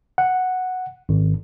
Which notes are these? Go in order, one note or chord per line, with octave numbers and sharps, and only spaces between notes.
F#5
G#1